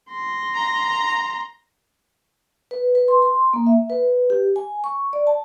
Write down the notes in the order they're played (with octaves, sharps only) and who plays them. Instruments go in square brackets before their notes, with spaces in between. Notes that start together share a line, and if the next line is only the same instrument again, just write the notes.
[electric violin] C6 A#6
[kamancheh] A#5
[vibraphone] B4
B4
C6
C6
A#3
E5
B4
G4
G#5
C#6
D5
A5